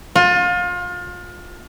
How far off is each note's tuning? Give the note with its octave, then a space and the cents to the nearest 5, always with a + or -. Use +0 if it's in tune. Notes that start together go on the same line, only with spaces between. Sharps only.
F4 +30